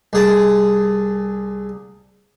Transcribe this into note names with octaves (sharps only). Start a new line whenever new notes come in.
C2 G#4 A5